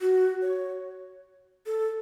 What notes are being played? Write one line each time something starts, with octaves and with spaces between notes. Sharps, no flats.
F#4
C#5
A4